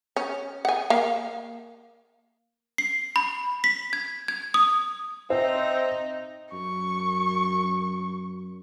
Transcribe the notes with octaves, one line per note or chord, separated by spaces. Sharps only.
C#4
F#5 G#5
A#3 F5
C7
B5
B6
G#6
G#6
D#6
C4 D#4 C5 E5
F#2 C#6